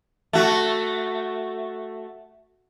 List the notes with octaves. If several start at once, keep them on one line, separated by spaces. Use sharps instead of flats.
A3 F#4